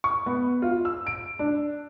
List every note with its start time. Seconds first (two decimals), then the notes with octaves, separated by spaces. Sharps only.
0.04 C#6
0.26 B3
0.62 F4
0.85 E6
1.07 D7
1.39 D4